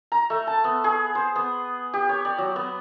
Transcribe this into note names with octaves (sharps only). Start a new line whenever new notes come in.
A#5
A3
A5
B3
G#4
C5
B3
G4
C#5
D5
F#3
B3